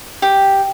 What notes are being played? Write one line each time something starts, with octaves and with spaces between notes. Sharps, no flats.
G4